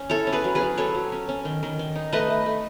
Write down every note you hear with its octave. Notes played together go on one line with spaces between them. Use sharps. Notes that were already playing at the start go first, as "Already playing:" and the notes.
Already playing: C#4
E4 A4 C#5
C#4
G#4 B4
F#3
G#4 B4
F#3
F#3 A4 C#5
F#3
C#4
C#4
D#3
D#3
D#3
D#4
A3 B4 D#5
A3
A3